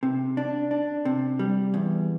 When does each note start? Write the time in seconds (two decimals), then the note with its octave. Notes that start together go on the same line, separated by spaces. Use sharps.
0.03 C3
0.37 D4
0.71 D4
1.05 C3
1.39 G3
1.74 E2